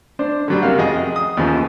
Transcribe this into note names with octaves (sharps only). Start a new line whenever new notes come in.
D4 C5
D3 F#3 G3
C3 A#3 F5 F#5
F2 F#4 G#4 D#5
D#6
D#2 C#3 E3 F3